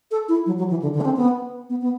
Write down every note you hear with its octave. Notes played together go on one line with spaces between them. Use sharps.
A4
E4
F#3
F#3
E3
D3
D3
D4
C4
B3
B3
B3